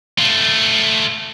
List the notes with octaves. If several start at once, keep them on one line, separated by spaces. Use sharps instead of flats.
A3 F4